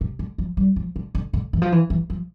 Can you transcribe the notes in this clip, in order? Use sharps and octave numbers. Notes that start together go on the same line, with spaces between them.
C3
D3
F3
G3
F3
D3
D3
D3
E3
F3
E3
E3
F3